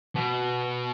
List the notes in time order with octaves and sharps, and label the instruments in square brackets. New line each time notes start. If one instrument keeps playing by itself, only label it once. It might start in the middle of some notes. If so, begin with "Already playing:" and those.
[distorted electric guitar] B2